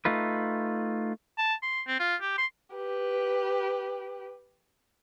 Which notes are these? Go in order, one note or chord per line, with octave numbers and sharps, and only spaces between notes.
A3 D#4 F4 B4
A5
C6
C4
F4
G4
C6
G4 B4